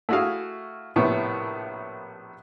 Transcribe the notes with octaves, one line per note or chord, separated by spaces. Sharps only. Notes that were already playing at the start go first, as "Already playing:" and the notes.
A3 E4 F#4 G#4 F5
A#1 A2 C3 B3